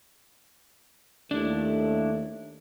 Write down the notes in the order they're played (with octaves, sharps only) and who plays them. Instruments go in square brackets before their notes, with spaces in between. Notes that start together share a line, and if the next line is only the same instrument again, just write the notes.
[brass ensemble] D#2 A3 [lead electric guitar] D4 E4